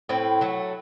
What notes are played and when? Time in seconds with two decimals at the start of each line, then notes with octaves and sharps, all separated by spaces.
0.09 A2 C4 E4
0.41 F#3 A3